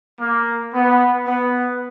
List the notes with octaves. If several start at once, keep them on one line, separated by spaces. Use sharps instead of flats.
A#3
B3
B3